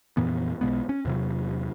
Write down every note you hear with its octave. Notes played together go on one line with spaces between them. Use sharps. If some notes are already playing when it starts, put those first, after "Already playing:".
F2 A#2 E3 B3
B1 B2 G#3 B3
C#4
E2 C3 F#3